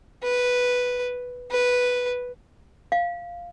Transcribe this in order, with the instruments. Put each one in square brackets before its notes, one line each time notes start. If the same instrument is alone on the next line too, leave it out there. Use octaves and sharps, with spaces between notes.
[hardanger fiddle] B4
B4
[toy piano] F5